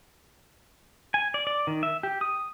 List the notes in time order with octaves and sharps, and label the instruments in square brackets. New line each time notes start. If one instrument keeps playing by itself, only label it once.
[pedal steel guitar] G#5
D5
D5
D#3
E5
G4
D#6